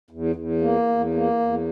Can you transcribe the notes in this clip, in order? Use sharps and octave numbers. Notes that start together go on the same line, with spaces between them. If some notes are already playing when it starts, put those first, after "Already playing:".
E2
E2
A#3
E2
A#3
E2